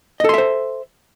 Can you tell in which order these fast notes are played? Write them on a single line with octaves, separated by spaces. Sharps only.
D#5 A4 C6 E5 C5